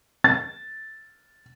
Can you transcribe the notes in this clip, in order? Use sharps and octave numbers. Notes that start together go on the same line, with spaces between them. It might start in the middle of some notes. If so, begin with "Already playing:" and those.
A6